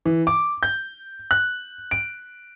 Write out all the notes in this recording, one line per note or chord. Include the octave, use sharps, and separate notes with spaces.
E3
D6
G6
F#6
D7